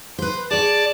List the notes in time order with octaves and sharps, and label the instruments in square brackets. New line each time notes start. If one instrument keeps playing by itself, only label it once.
[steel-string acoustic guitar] B4 C5
[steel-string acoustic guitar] G#4 C#5 [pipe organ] D5 A5 D6